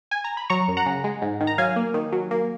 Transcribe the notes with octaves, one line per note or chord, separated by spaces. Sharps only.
G#5
A#5
B5
F#3 A#5 C#6
F#2
F#5 A#5
C#3
G#3
G#2
D#3
A#5
F#3 F5 G#5
A#3
D#3
F#3
A#3